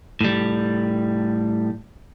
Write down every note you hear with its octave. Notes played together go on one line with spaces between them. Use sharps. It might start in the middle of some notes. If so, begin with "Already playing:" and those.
A2 G3